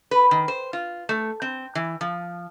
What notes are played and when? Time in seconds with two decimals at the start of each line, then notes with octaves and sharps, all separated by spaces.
0.11 B4
0.31 D#3
0.48 C5
0.73 F4
1.09 A3
1.42 C4
1.75 E3
2.01 F3